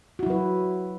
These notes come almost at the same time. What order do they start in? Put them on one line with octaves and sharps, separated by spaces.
F#4 E4 F#3 B4